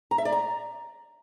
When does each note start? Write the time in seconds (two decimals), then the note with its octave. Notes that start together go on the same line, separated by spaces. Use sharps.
0.11 A#5
0.18 E5
0.25 D5
0.32 A#5